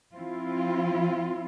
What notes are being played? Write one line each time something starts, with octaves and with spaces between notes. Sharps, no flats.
F3 C4 E4 F4